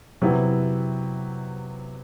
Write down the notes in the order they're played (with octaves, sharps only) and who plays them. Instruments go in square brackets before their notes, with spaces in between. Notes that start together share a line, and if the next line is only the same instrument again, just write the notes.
[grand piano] C3 F#3 B3 E4